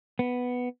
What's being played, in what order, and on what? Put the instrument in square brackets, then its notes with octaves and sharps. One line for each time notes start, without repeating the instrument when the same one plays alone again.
[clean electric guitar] B3